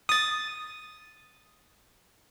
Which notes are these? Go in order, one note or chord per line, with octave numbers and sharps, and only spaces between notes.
D#6 A6